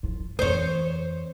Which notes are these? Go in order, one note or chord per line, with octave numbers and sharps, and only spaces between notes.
F3 F4
F2 E3 C5 C#5